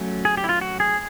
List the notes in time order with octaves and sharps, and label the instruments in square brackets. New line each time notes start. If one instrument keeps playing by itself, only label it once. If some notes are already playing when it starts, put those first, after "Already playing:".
Already playing: [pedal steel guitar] F#3 A3 C#4
G#4
G4
E4
F4
F#4
G#4